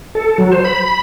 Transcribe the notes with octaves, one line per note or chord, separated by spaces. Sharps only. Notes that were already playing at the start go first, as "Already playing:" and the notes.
A4
F#3
C5
B5